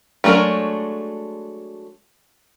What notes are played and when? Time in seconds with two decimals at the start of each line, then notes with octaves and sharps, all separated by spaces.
0.24 F#3 G#3 A3 D4 A#4